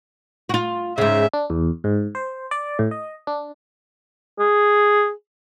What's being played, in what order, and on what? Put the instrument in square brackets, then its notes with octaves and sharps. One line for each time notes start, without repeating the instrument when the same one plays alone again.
[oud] F4 F#4
[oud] G#2 C#3 [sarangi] E5
[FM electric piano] D4
E2
G#2
C5
D5
A2
D#5
D4
[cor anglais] G#4